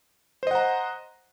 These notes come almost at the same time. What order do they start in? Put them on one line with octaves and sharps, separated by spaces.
C5 D#5 F#5 A#5